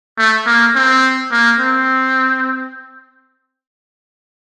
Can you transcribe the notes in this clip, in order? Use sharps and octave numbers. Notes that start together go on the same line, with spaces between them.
A3
A#3
C4
A#3
C4